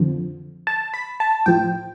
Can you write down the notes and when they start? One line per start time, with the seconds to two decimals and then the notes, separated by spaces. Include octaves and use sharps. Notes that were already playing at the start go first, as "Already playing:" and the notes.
Already playing: F2 D3 F3
0.67 A5
0.94 B5
1.20 A5
1.46 A2 F3 G5